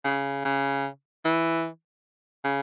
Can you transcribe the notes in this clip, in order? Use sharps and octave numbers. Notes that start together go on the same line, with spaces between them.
C#3
C#3
E3
C#3